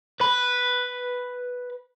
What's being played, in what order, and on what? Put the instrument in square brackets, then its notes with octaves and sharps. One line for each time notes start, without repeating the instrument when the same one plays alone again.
[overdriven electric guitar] B4 B5